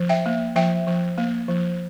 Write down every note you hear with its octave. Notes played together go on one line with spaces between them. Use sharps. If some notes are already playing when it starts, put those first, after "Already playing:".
Already playing: F3
E5 G5
A#3
F3 E5 G5
F3
A#3
F3